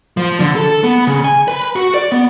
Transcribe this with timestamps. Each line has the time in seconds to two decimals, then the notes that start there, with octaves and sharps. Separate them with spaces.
0.17 F3
0.40 D3
0.56 A4
0.83 B3
1.07 C#3
1.24 G#5
1.48 B4
1.76 F#4
1.94 D5
2.12 B3